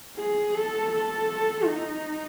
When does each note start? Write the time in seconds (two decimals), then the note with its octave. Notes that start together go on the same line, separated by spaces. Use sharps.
0.17 G#4
0.54 A4
0.92 A4
1.65 D#4